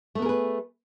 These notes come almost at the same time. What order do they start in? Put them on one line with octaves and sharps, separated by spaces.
A3 B3 A#4 G#4 B4